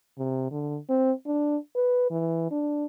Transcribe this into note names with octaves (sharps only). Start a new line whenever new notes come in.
C3
D3
C4
D4
B4
E3
D4